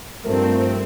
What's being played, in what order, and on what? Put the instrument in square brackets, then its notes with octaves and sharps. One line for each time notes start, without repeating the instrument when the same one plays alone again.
[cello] G2 [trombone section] F3 A3 [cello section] C4 [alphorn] A#4